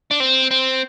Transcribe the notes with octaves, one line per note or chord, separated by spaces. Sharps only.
D4
C4
C4